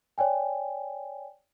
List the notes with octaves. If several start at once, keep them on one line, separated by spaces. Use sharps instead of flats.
C#5 D5 G5 G#5